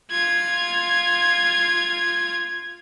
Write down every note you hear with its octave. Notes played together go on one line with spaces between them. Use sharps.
F4 G#6